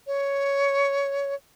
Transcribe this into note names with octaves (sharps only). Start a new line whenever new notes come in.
C#5